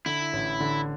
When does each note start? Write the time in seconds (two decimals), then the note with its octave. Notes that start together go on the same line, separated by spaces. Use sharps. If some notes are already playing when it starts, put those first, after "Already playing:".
0.06 D3 E4
0.33 A1
0.60 D3